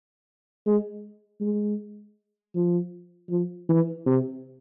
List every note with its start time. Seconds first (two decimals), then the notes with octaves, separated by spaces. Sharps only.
0.66 G#3
1.41 G#3
2.55 F3
3.30 F3
3.69 E3
4.06 C3